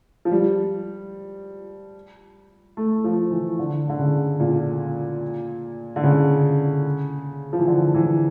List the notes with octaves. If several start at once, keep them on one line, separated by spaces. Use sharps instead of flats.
F3
G3
A3
F3
E3
D3
D3
C#3
A#2
D3
C#3
F3
E3
D3
E3